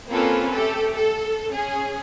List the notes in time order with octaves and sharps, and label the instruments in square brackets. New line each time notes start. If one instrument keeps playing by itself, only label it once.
[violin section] A#3 C4 C#4 F4 A4 B4
A3 G4 A4
A4
C#4 G#4